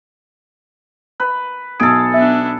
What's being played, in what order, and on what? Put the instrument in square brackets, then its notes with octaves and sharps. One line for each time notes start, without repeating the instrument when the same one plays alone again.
[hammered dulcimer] B4
[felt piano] B1 D7 [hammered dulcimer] G#4 A4
[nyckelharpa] B3 D4 [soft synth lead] E5